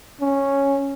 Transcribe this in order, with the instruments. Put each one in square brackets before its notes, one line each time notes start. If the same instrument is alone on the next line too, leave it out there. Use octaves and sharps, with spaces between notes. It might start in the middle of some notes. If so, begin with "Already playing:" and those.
[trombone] C#4